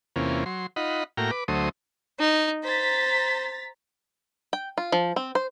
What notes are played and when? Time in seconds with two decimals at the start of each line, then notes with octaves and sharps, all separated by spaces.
0.16 E2 C3 A#3 C#4 F4
0.46 F#3 C6
0.76 D#4 F4 D#5 F#5 B5
1.17 A2 A#3 F#4 G5 A#5 F6
1.31 B4 D6
1.48 D2 F#3 A3 C5 D#6
2.19 D#4
2.64 C5 A#5 A6 B6
4.53 G5
4.78 F4
4.92 F3
5.16 C4
5.35 C5